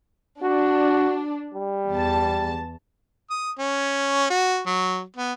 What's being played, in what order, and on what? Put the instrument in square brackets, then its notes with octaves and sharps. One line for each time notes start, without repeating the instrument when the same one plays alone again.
[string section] D4 [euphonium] F#4
[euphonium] G3
[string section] E2 A5
[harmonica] D#6
C#4
F#4
F#3
B3